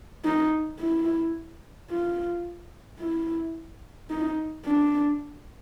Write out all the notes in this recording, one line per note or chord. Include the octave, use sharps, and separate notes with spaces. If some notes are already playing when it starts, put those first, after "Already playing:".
D#4
E4
F4
E4
D#4
D4